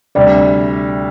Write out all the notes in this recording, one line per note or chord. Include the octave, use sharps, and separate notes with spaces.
D2 C3 G3 D5